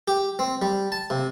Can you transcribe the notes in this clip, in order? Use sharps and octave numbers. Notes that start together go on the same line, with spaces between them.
G4
C4
G3
A5
C3